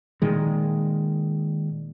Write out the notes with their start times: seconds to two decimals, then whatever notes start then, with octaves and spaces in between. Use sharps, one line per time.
0.22 A#2 D#3 G#3